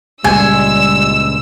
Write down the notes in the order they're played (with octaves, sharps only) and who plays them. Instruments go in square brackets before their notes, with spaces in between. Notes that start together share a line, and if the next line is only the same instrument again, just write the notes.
[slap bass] C#2 A#2 [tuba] G3 [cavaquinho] G#5 [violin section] E6